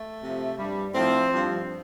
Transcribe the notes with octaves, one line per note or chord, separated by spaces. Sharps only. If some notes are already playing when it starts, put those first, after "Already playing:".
Already playing: A3
C3 F3
G2 G3
A2 F3 C4
G2 F3